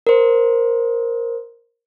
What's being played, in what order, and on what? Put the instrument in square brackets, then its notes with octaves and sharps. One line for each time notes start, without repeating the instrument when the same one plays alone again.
[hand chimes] A#4 C5